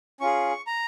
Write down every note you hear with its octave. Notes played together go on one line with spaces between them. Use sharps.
C#4 F4 G#4 C#6
A#5